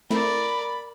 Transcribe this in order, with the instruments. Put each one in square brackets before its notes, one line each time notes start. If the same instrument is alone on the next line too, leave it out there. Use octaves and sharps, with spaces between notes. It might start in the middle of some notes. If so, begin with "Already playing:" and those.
[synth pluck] A3 C4 E4 [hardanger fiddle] A#4 D5 [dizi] B5